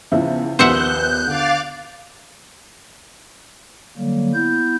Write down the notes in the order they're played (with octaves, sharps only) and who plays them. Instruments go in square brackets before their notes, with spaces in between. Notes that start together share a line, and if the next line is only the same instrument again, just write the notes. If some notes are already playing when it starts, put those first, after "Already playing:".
[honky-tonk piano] E2 F3 E4 [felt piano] C#3
[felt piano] A#1 D#2 [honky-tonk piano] B3 [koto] C5 E5 F#5 [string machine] F#6 G6
[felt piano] D3 [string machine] F5 D6 A6
[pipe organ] D3 F#3 G3 A#3
B3 E4 G6